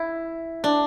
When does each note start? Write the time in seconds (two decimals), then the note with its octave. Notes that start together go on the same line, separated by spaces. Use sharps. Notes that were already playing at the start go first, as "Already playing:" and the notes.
Already playing: E4
0.64 D4